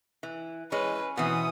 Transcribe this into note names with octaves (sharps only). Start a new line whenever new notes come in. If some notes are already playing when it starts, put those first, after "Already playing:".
E3
E3 G#3 C#4 B4
B2 E3 B3 C4 D#6